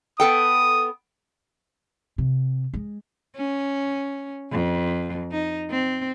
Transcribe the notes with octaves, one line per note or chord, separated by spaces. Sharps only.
B3 A4 G5 D#6
C3
G#3
C#4
F2
D#4
C4